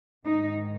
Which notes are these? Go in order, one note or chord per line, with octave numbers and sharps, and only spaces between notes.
G#2 D#3 D#4